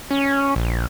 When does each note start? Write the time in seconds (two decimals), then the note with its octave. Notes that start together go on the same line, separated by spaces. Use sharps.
0.11 C#4
0.56 A#1